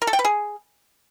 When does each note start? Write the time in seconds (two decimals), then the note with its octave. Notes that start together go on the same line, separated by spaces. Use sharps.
0.02 A#4
0.07 A4
0.13 G5
0.19 B4
0.25 G#4